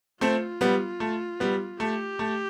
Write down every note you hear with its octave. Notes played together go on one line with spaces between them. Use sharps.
A3 C4 F4
G3 B3
A3
G3 B3
A3 G4
A3